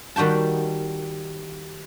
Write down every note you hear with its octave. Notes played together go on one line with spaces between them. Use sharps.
D#3 G3 F#4 G5 A5